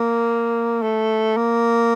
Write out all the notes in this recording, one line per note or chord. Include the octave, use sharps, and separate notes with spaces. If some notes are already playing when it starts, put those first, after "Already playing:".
Already playing: A#3
A3
A#3